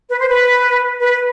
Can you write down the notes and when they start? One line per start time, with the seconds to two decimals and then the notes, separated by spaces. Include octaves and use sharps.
0.10 B4
0.19 C5
0.28 B4
1.00 B4